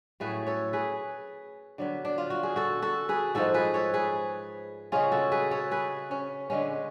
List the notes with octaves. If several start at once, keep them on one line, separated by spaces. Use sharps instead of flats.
A2 F#3 A3 C#4 G#4 B4
A4 C#5
G#4 B4
D3 F#3 B3
D4
F4
F#4
G#4
F#4 A4
F#4 A4
G#4 B4
G#2 F3 G#3 F#4 A4
G#4 B4
A4 C#5
G#4 B4
C#3 G#3 C#4 F4 G#4
F#4 A4
G#4 B4
A4 C#5
G#4 B4
C#4
D3 G#3 B3 C#4